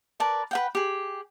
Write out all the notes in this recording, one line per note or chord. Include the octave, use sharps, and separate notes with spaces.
A#4 B4 D5 A5
B4 F#5 G5
G4 G#4